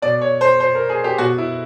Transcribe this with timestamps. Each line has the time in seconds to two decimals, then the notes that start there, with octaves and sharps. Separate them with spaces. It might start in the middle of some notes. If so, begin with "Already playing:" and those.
0.02 B2 D5
0.21 C#5
0.41 C5
0.60 C5
0.75 A#4
0.89 G#4
1.04 G4
1.18 B2 F#4
1.38 E4